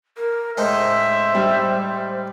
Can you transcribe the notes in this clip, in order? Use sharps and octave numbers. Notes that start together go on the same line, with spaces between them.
A#4
A2 G#3 D#4 C5 E5
G3